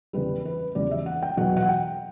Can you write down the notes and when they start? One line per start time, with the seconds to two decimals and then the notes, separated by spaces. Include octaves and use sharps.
0.13 E2 C#3 G3 B4
0.45 B4
0.75 E2 C#3 G3 D5
0.91 E5
1.06 F#5
1.23 G5
1.37 E2 B2 F#3 F#5
1.57 F#5
1.69 G5